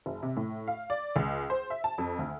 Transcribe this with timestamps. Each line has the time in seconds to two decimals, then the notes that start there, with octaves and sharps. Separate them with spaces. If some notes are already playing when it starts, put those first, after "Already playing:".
0.06 F#1
0.23 C3
0.37 A2
0.68 F5
0.90 D5
1.16 C#2
1.50 C5
1.70 E5
1.84 A5
1.98 F2
2.18 D2